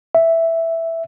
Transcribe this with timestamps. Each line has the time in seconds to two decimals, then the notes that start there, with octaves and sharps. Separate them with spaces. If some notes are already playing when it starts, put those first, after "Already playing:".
0.15 E5